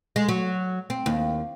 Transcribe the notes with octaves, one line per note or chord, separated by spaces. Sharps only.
G#3
F#3
C4
D#2